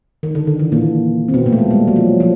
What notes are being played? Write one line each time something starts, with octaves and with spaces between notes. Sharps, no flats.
D#3
D3
D3
E3
A#2 A#3
C4
B2 B3
A#2 A#3
A3
G#3
G3
F#3
F3
F3